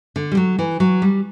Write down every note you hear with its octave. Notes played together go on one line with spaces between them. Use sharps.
D3
G3
F#3
E3
F#3
G3